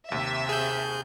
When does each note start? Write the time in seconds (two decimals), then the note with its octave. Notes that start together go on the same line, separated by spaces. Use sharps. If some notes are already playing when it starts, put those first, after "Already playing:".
0.12 D#2 C3 E5
0.49 G#4 G6